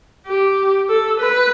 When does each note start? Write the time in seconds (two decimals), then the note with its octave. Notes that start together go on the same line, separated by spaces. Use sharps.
0.27 G4
0.89 A4
1.20 B4